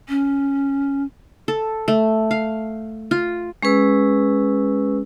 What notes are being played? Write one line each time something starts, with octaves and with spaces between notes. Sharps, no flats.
C#4
A4
A3
F5
F4
G#3 C#4 G#4 B4 E6